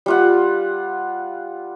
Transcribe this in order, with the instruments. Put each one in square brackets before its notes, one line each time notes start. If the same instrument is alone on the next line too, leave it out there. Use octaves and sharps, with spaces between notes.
[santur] G3 F4 F#5